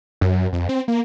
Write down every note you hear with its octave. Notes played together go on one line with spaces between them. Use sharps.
F#2
F2
C4
A#3